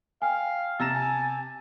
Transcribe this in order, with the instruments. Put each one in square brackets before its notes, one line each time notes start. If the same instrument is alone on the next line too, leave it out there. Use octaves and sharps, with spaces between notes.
[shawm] F5 [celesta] G5 G#5
[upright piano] C3 A#6 E7 [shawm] A5 [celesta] A#5 E6
[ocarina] G#5